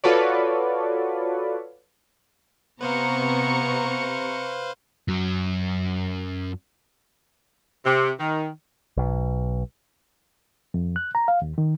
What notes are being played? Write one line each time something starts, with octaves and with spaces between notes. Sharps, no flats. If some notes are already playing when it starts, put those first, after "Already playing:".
F4 F#4 A4 B4 C#5 D5
C3 B3 B4 C5 F5 A#5 C#6 C#7
F#2 F#3
C3
D#3
B1
F2
F#6
A#5
F5
D#2
D#3